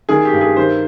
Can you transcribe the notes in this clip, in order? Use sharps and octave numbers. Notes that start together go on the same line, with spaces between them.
D#3 G#4
G4
G2
G#4
D#3 C5